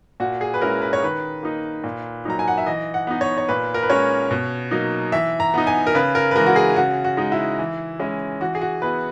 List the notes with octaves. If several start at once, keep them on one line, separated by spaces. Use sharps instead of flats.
A#2 F#4
G#4
B4
G#3 C#4 E4 A#4
B4
C#5
D#3 B4
A#3 D#4
A#2
F#3 A#3 D#4 A#5
G#5
F#5
E5
E3 D#5
F#5
B3 D#4
C#5
C#5
A#2 B4
A#4
B4
G#3 C#4 C#5
B2
F#3 A#3 D#4
E3 E5
A#5
B3 D#4
G#5
A#4
C#3 B4
A#4
B4
E3 G#3 A#4
F#4
G#4
C#3 F#4
F#4
G#3 D#4
E4
E3
G#3 C#4 E4
E3 F#4
G#4
F#4
B3 E4 B4